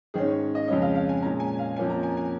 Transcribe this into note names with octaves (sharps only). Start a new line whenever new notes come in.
G#2 D#3 C#4 G#4
C#5
D#5
F2 C#3 G#3 C#4 D#5
F5
F5
G#5
A#2 G#3 C#4 A#5
G#5
F5
F2 F3 A#3 C#4 G#5
A#5
G#5
G#5